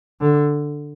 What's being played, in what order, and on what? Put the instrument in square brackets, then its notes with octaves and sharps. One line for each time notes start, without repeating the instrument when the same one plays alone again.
[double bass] D3